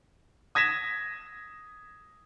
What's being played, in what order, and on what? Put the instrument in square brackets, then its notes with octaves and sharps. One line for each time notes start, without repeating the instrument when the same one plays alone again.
[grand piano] D#6 G#6 A#6 B6 E7